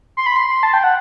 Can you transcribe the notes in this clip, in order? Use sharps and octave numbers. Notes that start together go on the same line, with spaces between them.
C6
B5
C6
A5
G5
F#5